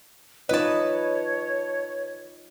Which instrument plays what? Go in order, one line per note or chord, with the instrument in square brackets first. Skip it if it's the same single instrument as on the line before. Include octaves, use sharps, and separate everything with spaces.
[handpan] D#4 F4 D#5 [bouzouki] B4 A5 [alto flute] C#5